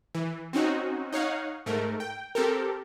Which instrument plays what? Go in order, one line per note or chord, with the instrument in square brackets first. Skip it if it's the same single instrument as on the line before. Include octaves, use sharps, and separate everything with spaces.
[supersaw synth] E3
C4 C#4 D#4 F#4
D#4 C#5 F5 F#5
G#2 A3 A#4
G5
C4 G4 A4 A#4